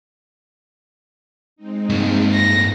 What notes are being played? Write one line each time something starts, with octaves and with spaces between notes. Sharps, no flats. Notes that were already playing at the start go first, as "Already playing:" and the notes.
G#3 C4 D#4
G2 A#3
A2 A#6